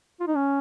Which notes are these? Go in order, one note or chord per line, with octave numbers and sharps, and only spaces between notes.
F4
D#4
C#4